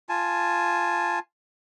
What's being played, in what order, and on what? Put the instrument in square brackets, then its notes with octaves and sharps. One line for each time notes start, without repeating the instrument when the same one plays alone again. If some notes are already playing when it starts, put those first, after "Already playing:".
[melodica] F4 G#5 A5